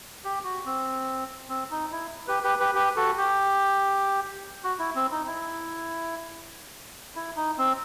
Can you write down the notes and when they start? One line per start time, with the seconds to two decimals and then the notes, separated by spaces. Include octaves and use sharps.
0.24 G4
0.44 F#4
0.66 C4
1.49 C4
1.71 D#4
1.92 E4
2.28 G4 B4
2.43 G4 B4
2.60 G4 B4
2.75 G4 B4
2.96 F#4 A4
3.18 G4
4.64 F#4
4.79 E4
4.95 C4
5.11 D#4
5.27 E4
7.16 E4
7.37 D#4
7.58 C4